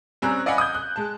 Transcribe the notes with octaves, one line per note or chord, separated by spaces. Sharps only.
G3 C4 C#4 G#5 A#5 F#6
D5 D#5 F5 F#5 G#5 B5
D#6 G6
F#6
G#3 A5